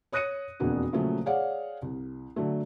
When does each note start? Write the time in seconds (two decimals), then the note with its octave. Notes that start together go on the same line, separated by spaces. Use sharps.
0.12 C#5 D#6 F#6 A#6 C#7 D#7
0.60 E1 F2 A#3 D4 F#4
0.93 A#2 C#3 F3 F#3 A3
1.26 G#4 C#5 D5 F5 F#5
1.82 C2
2.36 D3 F#3 A3